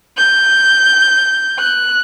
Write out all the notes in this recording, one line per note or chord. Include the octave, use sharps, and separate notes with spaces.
G6
F#6